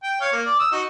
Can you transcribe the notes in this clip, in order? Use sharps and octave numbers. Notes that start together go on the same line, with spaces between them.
G5
C#5 F5
A#3
D5
D#6 E6
D#4 F#4